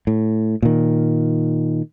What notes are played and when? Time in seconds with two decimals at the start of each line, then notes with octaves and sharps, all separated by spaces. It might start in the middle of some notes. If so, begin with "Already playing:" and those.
0.07 A2
0.62 A#2 D#3